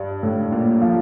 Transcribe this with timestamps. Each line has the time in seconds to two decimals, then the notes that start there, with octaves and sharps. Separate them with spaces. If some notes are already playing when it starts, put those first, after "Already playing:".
Already playing: G2
0.23 A2
0.52 A#2
0.81 F3